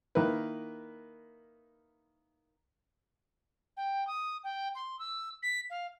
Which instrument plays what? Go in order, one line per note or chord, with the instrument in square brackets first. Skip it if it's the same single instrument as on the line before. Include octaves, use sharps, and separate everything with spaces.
[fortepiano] D#3 A#3 E4 A#4 B4
[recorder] G5
D#6
G5
C6
E6
B6
F5